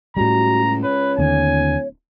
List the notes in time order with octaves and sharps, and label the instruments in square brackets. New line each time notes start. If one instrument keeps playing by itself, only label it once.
[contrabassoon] C#2 [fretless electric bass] A2 G3 [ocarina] F#4 [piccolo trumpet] A#5
[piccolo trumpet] B4 [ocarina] C#5
[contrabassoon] D1 [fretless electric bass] D#2 D3 [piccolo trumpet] G#5